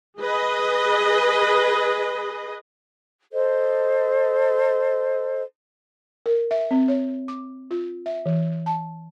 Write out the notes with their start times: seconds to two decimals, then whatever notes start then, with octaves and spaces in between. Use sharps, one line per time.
0.19 G#4 B4 D#5
3.33 A4 C5 D#5
6.26 A#4
6.51 E5
6.71 C4
6.88 C#5
7.28 D6
7.71 F4
8.06 E5
8.26 E3
8.66 A5